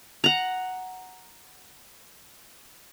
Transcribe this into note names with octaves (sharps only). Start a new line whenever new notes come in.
F#5 A#5